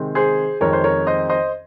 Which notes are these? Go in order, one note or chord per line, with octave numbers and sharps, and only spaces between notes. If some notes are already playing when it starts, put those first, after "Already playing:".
Already playing: C3 D#3 G#3 C4
G#4 C5
F2 D#3 G#3 C4 A#4 C#5
C5
A#4 C#5
C5 D#5
C5 D#5